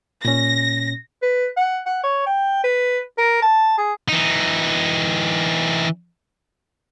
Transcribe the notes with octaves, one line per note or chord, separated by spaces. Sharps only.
A#2 C#4 A#6
B4
F#5
F#5
C#5
G5
B4
A#4
A5
G#4
E3 D#4